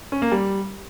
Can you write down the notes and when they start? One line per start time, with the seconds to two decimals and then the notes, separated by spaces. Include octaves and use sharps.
0.12 C#4
0.22 A#3
0.32 G3